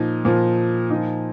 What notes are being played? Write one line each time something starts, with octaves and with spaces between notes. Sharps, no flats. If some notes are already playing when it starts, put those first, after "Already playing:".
Already playing: A#2 F3 D#4
A#2 F3
A#2 F3 D#4